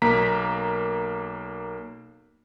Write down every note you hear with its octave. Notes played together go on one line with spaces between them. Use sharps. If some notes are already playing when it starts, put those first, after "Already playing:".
B1 A#3 A#5 B6